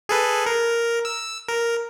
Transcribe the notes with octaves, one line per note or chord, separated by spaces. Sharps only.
G#4 A4 B4
A#4
E6
A#4